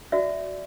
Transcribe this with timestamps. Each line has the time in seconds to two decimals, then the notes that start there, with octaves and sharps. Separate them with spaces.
0.12 F#4 D5 E5